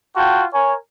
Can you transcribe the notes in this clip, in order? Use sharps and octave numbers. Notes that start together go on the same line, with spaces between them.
F4 F#4 G5 A5
A#4 C#5 G#5